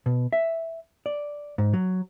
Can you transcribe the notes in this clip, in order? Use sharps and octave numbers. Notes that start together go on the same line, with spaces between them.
B2
E5
D5
G#2
F#3